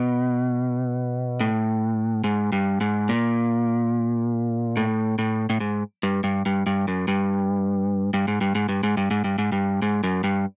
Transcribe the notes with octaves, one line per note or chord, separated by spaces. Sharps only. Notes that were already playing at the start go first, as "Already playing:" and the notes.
Already playing: B2
A2
G#2
G2
G#2
A#2
A2
A2
A2
G#2
G2
G2
G2
G2
F#2
G2
G2
G#2
G2
G#2
G2
G#2
G2
G#2
G2
G#2
G2
G#2
F#2
G2